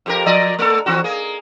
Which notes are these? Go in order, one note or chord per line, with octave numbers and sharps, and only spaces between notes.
F2 G4 A#4
F3 D5 D#5
A3 A4
E3 C4 F#4
A#3 G#4